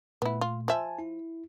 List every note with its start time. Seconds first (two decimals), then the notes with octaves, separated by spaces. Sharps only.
0.22 A#2 A3 B3 E4
0.41 F4
0.68 F3 E5 G#5 A5
0.99 E4